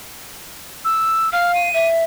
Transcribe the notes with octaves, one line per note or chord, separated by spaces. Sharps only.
E6
F5 F6
D#7
E5